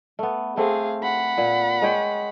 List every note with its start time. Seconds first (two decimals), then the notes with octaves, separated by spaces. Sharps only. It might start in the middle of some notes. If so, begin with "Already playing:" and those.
0.19 A3 B3
0.57 A3 C4 G#4 F5
1.03 F#5 B5
1.38 A#2
1.82 G#3 C#5 G5